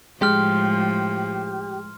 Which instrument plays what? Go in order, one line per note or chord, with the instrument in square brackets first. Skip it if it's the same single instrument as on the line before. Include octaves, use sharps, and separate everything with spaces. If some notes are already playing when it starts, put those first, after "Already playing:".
[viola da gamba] A2 F3 [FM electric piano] G#3 [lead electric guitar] G4 [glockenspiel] C6 F6